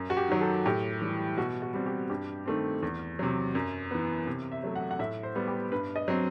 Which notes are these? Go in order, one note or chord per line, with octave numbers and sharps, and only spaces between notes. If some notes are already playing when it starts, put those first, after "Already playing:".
Already playing: F#2
F#4
G4
D#3 F#3
A4
A2 G4
E3 G3
B2 F#4
F#4
G3 C4
G4
G2 G4
D#3 A3 C4
E2
C3 F#3
F#2
E3 B3
C3
E5
F#3 A3
F#5
F#5
A2 E5
C5
G3 B3
G4
G2 B4
D#5
F#3 C4